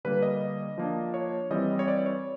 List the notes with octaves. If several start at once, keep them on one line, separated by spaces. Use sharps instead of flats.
D3 G3 A#3 B4
D#5
F3 A#3 D4
C#5
E3 G3 C4 D#5
C#5
D5
C#5